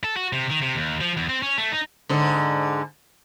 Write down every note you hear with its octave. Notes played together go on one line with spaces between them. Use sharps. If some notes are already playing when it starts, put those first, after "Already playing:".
A4
F#4
C3
D#3
C3
D#2
F3
E2
C4
C#4
A3
D#4
G#2 D3